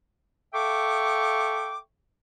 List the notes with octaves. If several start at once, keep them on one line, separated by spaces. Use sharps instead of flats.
A4 E5 F5 G5 C#6 D6